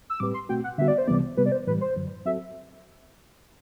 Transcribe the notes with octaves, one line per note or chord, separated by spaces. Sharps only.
E6
A2 G3 C4 G4 B4 D6
C6
B2 A3 C4 F#4 G5
F#5
D3 G3 B3 F#4 E5
D5
C5
C2 C3 E3 G3 B3 D5
C3 G3 B3 B4
D5
C5
A2 E3 G3 B4
C5
F#2 D3 F#3
F#3 C4 F#4 A4 E5